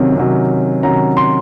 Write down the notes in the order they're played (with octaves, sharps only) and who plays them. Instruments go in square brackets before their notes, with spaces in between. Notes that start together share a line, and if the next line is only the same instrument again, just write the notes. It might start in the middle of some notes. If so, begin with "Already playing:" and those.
Already playing: [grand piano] C3 D#3 F#3 C#4
C3 D#3 F#3 C#4
C3 D#3 F#3 C#4 A#5
C6